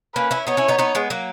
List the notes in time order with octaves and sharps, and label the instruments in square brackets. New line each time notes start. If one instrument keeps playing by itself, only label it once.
[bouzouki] A#3 C#4 [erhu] B4
[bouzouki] C#4 E4
[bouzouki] B3 D#4 [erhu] C#5
[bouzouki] C#4 E4
B3 D#4
B3 D#4
G#3 B3
F#3 A#3